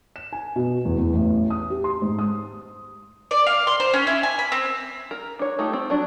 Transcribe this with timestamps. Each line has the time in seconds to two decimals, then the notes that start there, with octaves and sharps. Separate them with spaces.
0.16 E7
0.33 G#5
0.56 B2
0.85 E2
0.98 E2
1.13 A1
1.50 D#6
1.70 G4
1.84 C6
2.02 G#2
2.19 D#6
3.31 D5
3.46 F5
3.67 C6
3.80 C5
3.94 C#4
4.07 E4
4.23 G#5
4.39 B5
4.52 C4
5.11 A#4
5.39 D4 C#5
5.59 A3 D#4 F4 G4
5.73 C4
5.90 F#3 D4